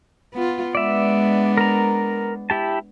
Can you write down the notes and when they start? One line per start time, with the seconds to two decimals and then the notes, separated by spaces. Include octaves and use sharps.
0.33 B3 F4
0.75 G#3 B3 D4 D5 E5
1.57 A#4 A#5
2.50 E4 G4 A5